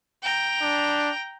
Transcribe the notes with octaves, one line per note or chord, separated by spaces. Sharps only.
G5 A#5
D4